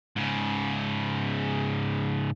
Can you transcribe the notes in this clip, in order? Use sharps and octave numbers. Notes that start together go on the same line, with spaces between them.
G#2 C#3